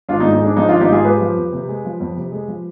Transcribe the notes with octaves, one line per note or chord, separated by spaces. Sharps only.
G#1 D4 F4
D#4
G#2
D#4
G#3 D4
F3 D#4
G#1 D4 F4
D#4 G4
G#2 F4 G#4
G#3 G4 B4
F3
F2
C3
G#3
F3
F2
C3
G#3
F3